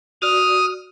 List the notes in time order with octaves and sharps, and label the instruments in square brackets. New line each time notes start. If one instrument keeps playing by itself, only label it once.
[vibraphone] F#4 D5 [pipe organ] D#6 F6